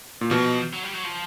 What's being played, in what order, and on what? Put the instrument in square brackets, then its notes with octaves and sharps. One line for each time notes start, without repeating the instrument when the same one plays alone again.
[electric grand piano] A#2
[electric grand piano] B2 [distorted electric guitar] F3
[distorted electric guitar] F#3
G3
F#3
F3